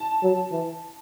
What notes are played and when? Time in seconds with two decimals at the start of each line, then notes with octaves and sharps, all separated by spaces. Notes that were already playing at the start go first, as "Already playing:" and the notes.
Already playing: A5
0.23 F#3
0.52 E3